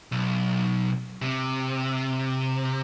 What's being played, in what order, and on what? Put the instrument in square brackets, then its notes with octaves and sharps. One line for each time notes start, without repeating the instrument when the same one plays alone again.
[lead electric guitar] B1
C3